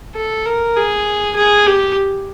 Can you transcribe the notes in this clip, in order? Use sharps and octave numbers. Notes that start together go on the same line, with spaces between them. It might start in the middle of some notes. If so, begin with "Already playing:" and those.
A4
A#4
G#4
G#4
G4